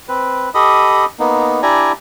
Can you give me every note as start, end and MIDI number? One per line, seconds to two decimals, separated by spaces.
0.09 0.50 60
0.09 0.50 71
0.54 1.05 67
0.54 1.05 69
0.54 1.05 75
0.54 1.05 83
0.54 1.05 87
1.19 1.61 58
1.19 1.61 59
1.19 1.61 63
1.63 1.92 62
1.63 1.92 64
1.63 1.92 67
1.63 1.92 74
1.63 1.92 80
1.63 1.92 82